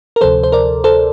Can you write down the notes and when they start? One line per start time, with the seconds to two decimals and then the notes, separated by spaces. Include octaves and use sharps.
0.16 A#4
0.21 D2 C3 F3 A4 C5
0.43 C5
0.52 A#4 D5
0.84 A4 C5